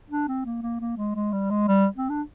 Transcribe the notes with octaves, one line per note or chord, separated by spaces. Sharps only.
D4
C4
A#3
A#3
A#3
G#3
G#3
G3
G#3
G3
C4
D4